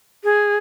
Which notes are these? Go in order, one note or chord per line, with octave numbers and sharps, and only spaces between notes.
G#4